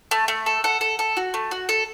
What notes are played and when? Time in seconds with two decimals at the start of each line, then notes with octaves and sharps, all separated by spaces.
0.11 A3
0.28 A3
0.46 A4
0.64 A4 F#5
0.81 A4
0.99 A4
1.17 F#4
1.34 A3
1.51 F#4
1.69 A4